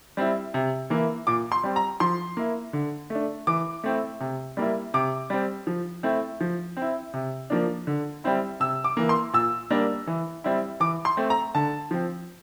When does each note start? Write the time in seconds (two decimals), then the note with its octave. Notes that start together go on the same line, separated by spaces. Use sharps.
0.17 G3 C4 E4
0.54 C3
0.90 E3 A#3 E4
1.27 A#2 D6
1.52 C6
1.64 G3 C4
1.76 A#5
2.00 F3 C6
2.37 A#3 E4
2.73 D3
3.10 A3 D4
3.47 E3 D6
3.84 A3 C4 E4
4.20 C3
4.57 G3 A#3 E4
4.94 C3 D6
5.30 G3 C4
5.67 F3
6.03 A3 C4 E4
6.41 F3
6.77 C4
6.82 E4
7.14 C3
7.50 F3 A#3 D4
7.87 D3
8.24 G3 C4 E4
8.60 C3 E6
8.84 D6
8.97 E3 A#3
9.09 C6
9.33 A#2 E6
9.70 G3 A#3 D4
10.07 E3
10.44 G3 C4 E4
10.80 E3 D6
11.05 C6
11.17 A3 C4
11.30 A#5
11.55 D3 A5
11.91 F3 C4